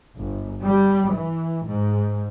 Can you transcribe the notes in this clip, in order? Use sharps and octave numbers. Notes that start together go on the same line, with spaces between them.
G1
G3
E3
G#2